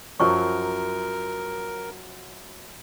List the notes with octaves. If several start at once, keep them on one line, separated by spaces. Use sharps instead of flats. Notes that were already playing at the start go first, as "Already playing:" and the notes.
F#2 F3 F#3 A#4 C#6